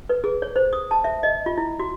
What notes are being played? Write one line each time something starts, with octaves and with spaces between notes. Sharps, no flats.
B4
G#4
C#5
C5
D#6
A5
E5
D#5
F4
E4
F#4